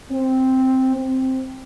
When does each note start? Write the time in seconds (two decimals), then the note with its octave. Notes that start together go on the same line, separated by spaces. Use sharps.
0.12 C4
0.95 C4